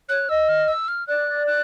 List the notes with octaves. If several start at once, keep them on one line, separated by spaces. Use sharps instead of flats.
C#5 F#6
D#5 E6
F6
E6
F6
D5 F#6
F#6